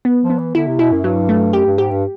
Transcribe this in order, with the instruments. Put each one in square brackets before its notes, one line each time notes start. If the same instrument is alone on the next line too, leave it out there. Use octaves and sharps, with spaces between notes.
[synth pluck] B3
[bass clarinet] F3
[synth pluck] B3
[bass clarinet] E3
[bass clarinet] D3 [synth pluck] E4
[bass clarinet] C3
[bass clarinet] B2 [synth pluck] E4
[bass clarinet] F#2
[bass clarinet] G2 [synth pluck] F#3
[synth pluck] A3
[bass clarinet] F#2 [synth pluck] G4
[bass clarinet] G2
[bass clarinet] G#2 [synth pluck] G4
[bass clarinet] G2